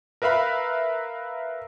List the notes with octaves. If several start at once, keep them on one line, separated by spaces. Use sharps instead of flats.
A#4 B4 E5 F5 B5